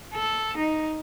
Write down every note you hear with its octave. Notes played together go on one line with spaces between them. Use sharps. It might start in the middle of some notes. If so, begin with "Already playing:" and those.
A4
D#4